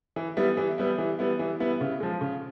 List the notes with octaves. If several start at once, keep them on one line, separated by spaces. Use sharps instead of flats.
E3
G3 B3 E4
E3
G3 B3 E4
E3
G3 B3 E4
E3
G3 B3 E4
C#3
F3 G#3
C#3